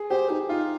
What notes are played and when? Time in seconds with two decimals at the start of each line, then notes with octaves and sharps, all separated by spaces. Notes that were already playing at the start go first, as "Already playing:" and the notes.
Already playing: G#4
0.10 G4 C5
0.29 D#4 G4
0.48 D#4 F4